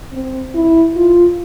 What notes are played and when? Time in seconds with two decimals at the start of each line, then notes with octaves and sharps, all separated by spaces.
0.13 C4
0.54 E4
0.96 F4